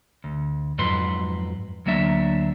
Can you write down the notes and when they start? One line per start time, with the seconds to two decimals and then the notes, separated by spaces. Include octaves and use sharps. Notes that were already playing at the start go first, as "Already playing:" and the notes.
0.24 D2
0.78 F2 G#2 F#3 B4 C6
1.86 D2 F#3 A#3 D4 E5